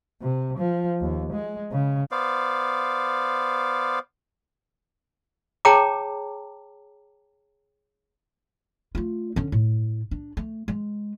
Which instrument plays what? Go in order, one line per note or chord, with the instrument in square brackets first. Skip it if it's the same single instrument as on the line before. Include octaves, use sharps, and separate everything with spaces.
[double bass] C3
F3
D#2
G#3
C#3
[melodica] B3 C5 D5 F5
[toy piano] G#4 C#5 G5 A5 A#5 D6
[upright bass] A3 F4
D3 C#4
A2
D4
A3
G#3